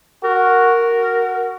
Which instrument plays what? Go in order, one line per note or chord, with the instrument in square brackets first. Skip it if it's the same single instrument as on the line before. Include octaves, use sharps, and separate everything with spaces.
[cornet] F#4 [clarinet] A#4
[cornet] F#4